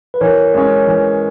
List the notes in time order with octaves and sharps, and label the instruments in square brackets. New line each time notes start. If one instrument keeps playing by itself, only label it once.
[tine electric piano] B4
[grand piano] E3 [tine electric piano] A#4 C#5
[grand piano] G#3 C#4
E3